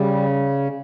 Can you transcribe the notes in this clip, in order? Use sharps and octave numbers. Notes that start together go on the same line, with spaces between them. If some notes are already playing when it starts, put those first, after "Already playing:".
Already playing: C#3 G3